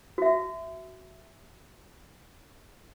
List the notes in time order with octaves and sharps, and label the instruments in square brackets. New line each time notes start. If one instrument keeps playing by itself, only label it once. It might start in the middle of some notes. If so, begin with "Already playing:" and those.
[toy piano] F#4 E5